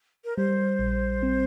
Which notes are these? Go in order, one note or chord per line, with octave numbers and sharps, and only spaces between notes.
A#4
G3 C5
A#1
C4